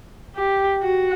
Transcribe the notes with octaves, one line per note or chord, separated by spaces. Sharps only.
G4
F#4